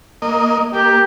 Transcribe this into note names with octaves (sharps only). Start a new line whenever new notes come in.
A#3 D#5
A#3 G4